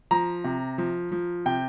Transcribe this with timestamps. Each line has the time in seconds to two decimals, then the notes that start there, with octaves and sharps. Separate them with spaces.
0.11 F3 A#5
0.44 C3
0.78 F3
1.12 F3
1.46 C3 G5